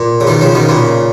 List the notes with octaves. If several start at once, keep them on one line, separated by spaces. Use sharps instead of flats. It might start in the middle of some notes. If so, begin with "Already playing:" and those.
Already playing: A#2
C#3
B2 D#3
C#3 F3
B2 D#3
A#2 C#3